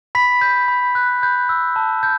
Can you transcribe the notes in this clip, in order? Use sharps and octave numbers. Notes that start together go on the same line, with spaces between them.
B5 B6
G6
B5
F#6
B5 G6
E6
A5
G6